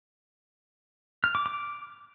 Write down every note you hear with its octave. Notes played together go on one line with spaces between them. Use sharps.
F6
D6
D6